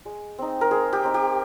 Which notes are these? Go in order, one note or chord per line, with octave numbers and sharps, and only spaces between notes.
G#3
C4 D#4
A#4
G#3 G#4
G4
C4 D#4
G4